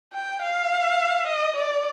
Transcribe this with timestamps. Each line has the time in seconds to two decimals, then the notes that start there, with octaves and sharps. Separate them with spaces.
0.13 G5
0.42 F5
1.27 D#5
1.56 D5